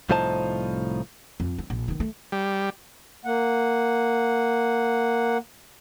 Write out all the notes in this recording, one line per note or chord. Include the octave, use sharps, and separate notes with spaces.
C2 A2 F3 D#4 C5 A5
F2
C4
A#1
D#3 B3
A3
G3
A#3 F#5